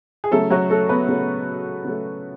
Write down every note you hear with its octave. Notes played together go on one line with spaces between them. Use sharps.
G#4
C#3 F#3 A3 A4
F#3 F#4
A3 A4
B3 B4
C#3 F#3 A3
C#3 F#3 A3